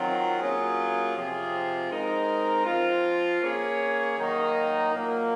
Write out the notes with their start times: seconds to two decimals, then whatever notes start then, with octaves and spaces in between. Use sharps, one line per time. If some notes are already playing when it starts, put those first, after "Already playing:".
Already playing: D#3 F#3 C4 F4
0.40 F#3 A#3 C#4 F4 G#4
1.16 C3 F3 C4 F4 G#4
1.91 G#3 C4 D#4 A#4
2.66 F3 C4 F4
3.42 A#3 C#4 G#4 C#5
4.18 D#3 F#3 A#3 D#4
4.94 A#2 F#3 A#3